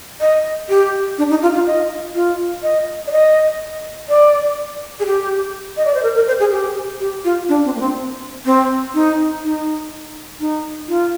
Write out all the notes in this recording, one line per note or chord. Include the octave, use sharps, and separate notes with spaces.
D#5
G4
D4
D#4
F4
F4
D#5
F4
D#5
D5
D#5
D5
G#4
G4
D#5
D5
C5
A#4
A#4
C5
G#4
G4
G4
F4
D4
C4
A#3
C4
C4
D#4
D#4
D#4
F4